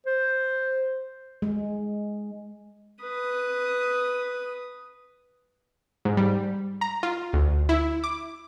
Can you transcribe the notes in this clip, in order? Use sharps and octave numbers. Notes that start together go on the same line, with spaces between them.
C5
G#3
B4 D#6
G#2
G3
A#5
F4
D2
E4
D6